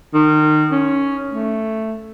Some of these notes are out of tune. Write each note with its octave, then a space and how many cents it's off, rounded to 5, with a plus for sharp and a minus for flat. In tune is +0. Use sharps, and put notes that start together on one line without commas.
D#3 -25
C#4 +5
A3 +5